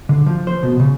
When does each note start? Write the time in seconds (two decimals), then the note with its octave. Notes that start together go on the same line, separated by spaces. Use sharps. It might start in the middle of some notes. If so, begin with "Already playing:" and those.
0.09 D3
0.26 F3
0.47 C5
0.63 B2
0.80 C#3